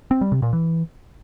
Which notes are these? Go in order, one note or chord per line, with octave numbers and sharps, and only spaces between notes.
C4
G3
C3
A#2
E3